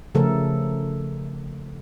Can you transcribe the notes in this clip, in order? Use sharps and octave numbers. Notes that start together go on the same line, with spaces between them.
C#3 F3 A3 A4 A#4